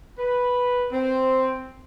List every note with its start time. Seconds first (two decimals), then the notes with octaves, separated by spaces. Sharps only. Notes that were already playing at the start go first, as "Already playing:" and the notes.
0.18 B4
0.91 C4